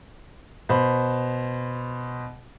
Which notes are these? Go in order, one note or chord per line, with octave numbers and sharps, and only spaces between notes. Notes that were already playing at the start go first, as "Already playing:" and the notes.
B2 C5 B5